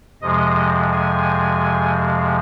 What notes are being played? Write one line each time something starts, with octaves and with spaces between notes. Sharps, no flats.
F2 C3 F3 G#3 D#5
G#5